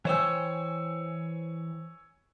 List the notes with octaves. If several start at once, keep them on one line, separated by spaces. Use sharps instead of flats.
E3 C5 C#5 G5 G#5 E6